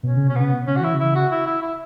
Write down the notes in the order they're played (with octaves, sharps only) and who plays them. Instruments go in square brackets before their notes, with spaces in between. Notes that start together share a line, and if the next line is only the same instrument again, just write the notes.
[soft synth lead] B2 [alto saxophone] C#4
[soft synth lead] C#3
[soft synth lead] B2 [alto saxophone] C#4
[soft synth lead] C#3 [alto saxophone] B3
[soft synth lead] B2
[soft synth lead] C#3 [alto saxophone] C#4
[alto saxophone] F#4
[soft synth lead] E3 [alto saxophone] E4
[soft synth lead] C#3
[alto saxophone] E4
F#4
E4
E4
E4